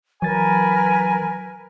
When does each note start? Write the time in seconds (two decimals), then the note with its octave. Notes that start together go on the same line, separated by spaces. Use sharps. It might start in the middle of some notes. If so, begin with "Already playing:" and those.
0.22 E3 F#3 A#4 B4 G#5 A6